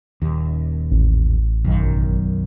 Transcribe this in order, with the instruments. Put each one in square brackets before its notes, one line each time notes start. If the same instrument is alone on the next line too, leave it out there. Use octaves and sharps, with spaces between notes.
[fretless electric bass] D#1 D#2
[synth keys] A1
[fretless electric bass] B1 F#2 D#3